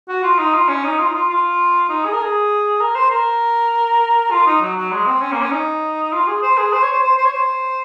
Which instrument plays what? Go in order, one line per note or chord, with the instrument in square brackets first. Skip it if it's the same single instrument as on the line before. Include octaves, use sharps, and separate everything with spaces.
[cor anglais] F#4
F4
D#4
F4
C#4
D#4
F4
D#4
F4
F4
D#4
G#4
A#4
G#4
A#4
C5
A#4
F4
D#4
F#3
F#3
G#3
C4
C#4
A#3
C#4
D#4
F4
G#4
C5
G#4
C5
C#5
C5
C5
C5
C#5
C5